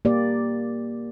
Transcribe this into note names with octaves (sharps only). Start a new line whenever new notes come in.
A#3 G4 D5